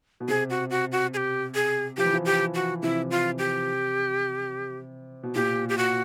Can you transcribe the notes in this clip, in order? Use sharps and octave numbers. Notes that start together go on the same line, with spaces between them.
B2
C3 G#4
F#4
F#4
F#4
G#4
G4
G#4
F3 G4
E3
F3
G4
F#4
C3 E4
F4
G4
B2
A#2 G4
G4
F#4